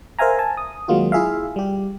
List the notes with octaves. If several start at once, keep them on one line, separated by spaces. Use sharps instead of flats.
A#4 C5 E5 F5 G#5 A#5
G#5 A5
D#6
D#3 F#3 G#3 A#3 F4 F#4
E4 F4 G#4 E5 F5
G3 G4